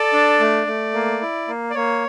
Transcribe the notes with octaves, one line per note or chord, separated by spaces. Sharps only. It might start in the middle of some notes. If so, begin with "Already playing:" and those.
Already playing: A4 D5
D4
A3
A3
A#3
E4
A#3
D5
A#3 C#5